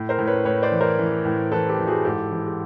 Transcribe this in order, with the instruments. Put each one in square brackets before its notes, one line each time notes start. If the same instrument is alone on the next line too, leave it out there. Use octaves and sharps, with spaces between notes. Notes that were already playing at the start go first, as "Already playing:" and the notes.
Already playing: [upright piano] A2
A#4 C5
A2
B4 C#5
A2 B4 C#5
C5 D5
E3
A#4 C5
E3
A2
E3 A4 B4
G4 A4
E3
F#4 G#4
G#2 G4 A4
E3
G4